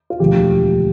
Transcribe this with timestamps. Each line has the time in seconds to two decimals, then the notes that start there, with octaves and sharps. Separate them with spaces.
0.10 F4
0.20 E1 D2 D3 F3 G4